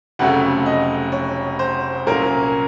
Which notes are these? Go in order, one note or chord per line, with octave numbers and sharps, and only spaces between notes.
F1 F2 C#3 F#3 A3 F#5
D#5
C#5
C5
C2 A#2 F#3 A#3 C#4 A#4